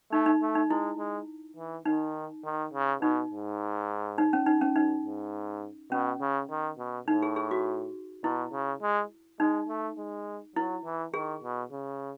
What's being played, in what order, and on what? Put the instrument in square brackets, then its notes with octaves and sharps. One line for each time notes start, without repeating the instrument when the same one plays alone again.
[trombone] A3 [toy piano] D#4
[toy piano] D#4
[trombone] A3
[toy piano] D#4
[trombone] G#3 [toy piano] E4
[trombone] G#3
E3
[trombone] D#3 [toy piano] D#4
[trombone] D#3
C#3
[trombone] B2 [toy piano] D#4
[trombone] G#2
[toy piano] D#4
C#4
D#4
C#4
[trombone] F#2 [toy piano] D#4
[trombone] G#2
[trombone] B2 [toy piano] C#4
[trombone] C#3
D#3
B2
[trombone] A2 [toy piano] D#4
[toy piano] G#4
G#4
F#4
[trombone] B2 [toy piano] E4
[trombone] C#3
G#3
[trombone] G#3 [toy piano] D#4
[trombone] A3
G#3
[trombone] F#3 [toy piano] E4
[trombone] E3
[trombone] D#3 [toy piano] G#4
[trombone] B2
C#3